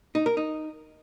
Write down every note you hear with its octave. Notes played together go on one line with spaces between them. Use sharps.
D#4
A#4
D#4